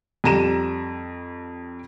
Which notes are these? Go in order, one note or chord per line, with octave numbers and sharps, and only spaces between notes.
F2 G3 A#5 D#7 E7